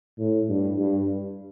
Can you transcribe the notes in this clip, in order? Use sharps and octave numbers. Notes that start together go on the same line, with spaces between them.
A2
G2
G2